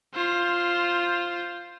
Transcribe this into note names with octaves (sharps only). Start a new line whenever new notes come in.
F4 C5